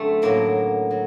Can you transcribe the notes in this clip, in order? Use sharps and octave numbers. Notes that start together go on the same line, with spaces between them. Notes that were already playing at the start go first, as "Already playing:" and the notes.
Already playing: F#2 D3 A3 C4
A2 F#3 A#3
F#3